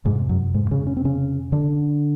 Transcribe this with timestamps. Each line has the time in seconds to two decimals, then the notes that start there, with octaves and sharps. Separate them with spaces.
0.05 F2 G#2 C3 G#3
0.29 F#2 F#3
0.54 G#2 G#3
0.71 C#3 C#4
0.87 C#4
0.97 C4
1.05 C#3 C#4
1.52 D3 D4